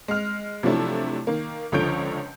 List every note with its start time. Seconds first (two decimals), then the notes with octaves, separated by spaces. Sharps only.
0.08 G#3 F6
0.63 C3 F3 F#3 A3 D4 E4
1.27 D#3 A#3
1.72 C#2 D3 F3 C#5 G6 D7